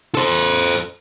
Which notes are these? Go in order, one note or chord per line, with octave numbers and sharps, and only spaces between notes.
A4 C5